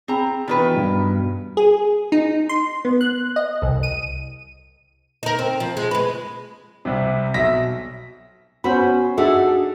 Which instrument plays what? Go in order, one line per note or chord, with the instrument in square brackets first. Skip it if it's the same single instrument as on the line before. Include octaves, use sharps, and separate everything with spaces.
[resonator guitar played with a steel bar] C4 A#5 [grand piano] G#4 B5
[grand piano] B2 E3 [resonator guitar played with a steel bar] D#3 D4 B4
[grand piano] G2 B2
[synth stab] G#4
D#4
C6
B3
F#6
D#5
C2
D#7
[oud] D#4 A#4
C4
F3
G#3
G#3 B4
[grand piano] C2 C3
B1 E5 A#6 B6
[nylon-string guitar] B3 F#4 [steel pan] C#4 C5 B5
[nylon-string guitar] D4 D#4 F#4 [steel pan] G#4 A4 E5